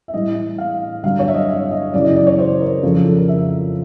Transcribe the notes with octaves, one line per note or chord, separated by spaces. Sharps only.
E5
A2 E3 G3 D#5
F5
G2 D3 F#3 F5
C#5
E5
D#5
E5
D#5
F#2 C#3 E3 D5
D#5
D5
C#5
C5
A#4
F2 C#3 F3 A4
A4
A4
A#4
E5